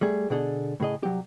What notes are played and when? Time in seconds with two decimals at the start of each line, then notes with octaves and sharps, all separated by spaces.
0.01 G3 A3 G#4
0.30 B2 D3 G#4 A4
0.80 A2 C#3 G#4 D#5
1.03 C2 F#3 G4